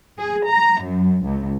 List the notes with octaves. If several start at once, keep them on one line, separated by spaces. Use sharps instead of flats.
G#4
A#5
F#2
C#2